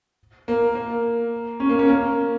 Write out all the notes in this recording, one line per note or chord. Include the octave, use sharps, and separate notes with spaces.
A#3
A#3
C#4
A#3
C#4
A#3